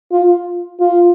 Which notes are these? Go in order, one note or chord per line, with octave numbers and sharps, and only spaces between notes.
F4
F4